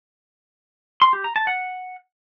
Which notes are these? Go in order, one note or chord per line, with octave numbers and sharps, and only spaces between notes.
C6
G4
A#5
A5
F#5